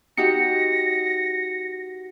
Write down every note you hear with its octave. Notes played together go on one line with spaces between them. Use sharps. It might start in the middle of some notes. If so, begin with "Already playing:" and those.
D#4 F#4 G4 A#6 C#7